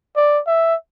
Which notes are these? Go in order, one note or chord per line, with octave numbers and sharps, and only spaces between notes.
D5
E5